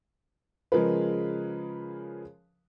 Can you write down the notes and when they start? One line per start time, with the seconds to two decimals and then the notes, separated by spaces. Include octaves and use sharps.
0.72 C#3 F3 G#3 G#4 A#4 B4